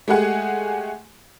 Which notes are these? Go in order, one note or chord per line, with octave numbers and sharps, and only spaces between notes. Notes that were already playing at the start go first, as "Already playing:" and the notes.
G#3 A3 G4 G#4 F#5 G#5